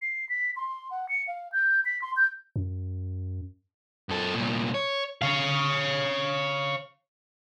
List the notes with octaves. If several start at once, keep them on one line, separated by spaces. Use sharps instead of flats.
C7
B6
C6
F#5
C#7
F5
G6
B6
C6
G6
F#2
F#2 A4
C2 A#2
C#5
C#5 F5